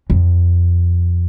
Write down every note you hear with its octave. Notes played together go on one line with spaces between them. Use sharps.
F2